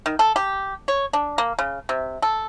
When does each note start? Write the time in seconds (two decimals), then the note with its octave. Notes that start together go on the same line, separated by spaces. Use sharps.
0.06 D#3
0.19 A4
0.36 G4
0.88 C#5
1.13 D4
1.38 A#3
1.59 C#3
1.89 C3
2.22 A4